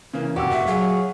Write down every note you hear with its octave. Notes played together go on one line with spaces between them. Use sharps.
C#3 E3 A#3
F1 A#2 F#4 G4 E6
E5
F#3 G#4 F5